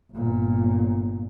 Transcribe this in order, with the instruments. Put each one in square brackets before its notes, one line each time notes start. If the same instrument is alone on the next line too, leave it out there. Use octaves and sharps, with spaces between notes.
[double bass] G1 A#2